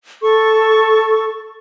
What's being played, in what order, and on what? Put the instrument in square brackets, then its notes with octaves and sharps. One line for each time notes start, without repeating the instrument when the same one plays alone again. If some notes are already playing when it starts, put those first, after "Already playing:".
[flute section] A4 C#6